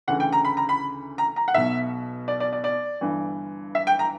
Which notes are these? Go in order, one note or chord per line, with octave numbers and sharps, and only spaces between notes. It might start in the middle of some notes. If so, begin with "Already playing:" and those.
D2 C#3 E3 F#5
G5
A#5
B5
A#5
B5
A#5
A#5
F#5
B1 B2 E5
D5
D5
D5
D5
G1 G2 E3
E5
G5
A#5